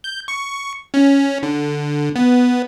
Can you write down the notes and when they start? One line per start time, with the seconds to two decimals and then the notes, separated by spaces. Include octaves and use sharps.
0.04 G6
0.28 C#6
0.94 C#4
1.43 D3
2.16 B3